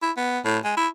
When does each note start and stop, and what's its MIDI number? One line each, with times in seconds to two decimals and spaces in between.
0.02 0.11 64
0.17 0.39 59
0.45 0.58 45
0.64 0.76 56
0.77 0.88 64